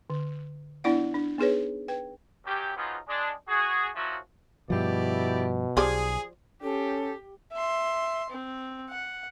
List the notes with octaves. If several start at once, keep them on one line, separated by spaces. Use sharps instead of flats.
D3
B3 D4 E4 D5 F#5
D4
B3 D#4 G#4 B4 C#5
B4 G5
F#2 G4
F3 F#3 G#3 B3 D#4 F4
G#3 D4
F#4 G#4
A#2 C#3 F3 F#3 E4 F#4
G2 B2 F3 E4 G4 D5
B1 F3 G4 G#4 D5
C#4 G4 A4
E5 C6
C4
F#5